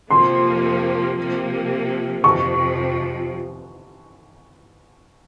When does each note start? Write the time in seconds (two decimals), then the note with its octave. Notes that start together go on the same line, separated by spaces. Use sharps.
0.11 F2 C3 F3 A#3 C6
1.18 C3 F3 A#3
2.24 F2 C3 F3 C#6